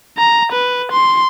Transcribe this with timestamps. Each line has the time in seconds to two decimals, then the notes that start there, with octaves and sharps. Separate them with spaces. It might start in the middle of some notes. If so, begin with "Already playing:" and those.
0.18 A#5
0.52 B4
0.92 C6